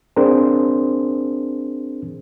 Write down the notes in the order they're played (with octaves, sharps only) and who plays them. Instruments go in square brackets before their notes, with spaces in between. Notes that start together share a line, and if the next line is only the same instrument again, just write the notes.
[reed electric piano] C4 D4 G#4 A#4 C5